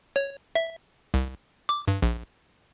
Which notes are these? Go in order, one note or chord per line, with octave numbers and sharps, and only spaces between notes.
C#5
E5
C2
D6
G2
A#1